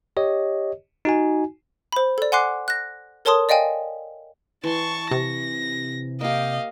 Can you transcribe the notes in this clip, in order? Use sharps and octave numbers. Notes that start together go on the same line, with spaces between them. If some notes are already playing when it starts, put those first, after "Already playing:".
G4 C#5 D#5
D#4 F#4 G#5
C5 B5
A4 D5
F#5 G#5 C6 D6 F#6 C7
F#6 A#6
A4 A#4 C#5 A5 C6 D#6
D5 D#5 F5 G5 G#5
E3 A5 C6 C#6
C3 C#6 A#6
A#3 G4 D#5 F5